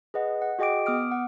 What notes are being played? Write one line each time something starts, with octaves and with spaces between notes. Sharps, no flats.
G#4 B4 D#5 F#5
F#5
F#4 G#4 D#5 G5 D6 D7
B3 D6 D#6 F6 D7
F#5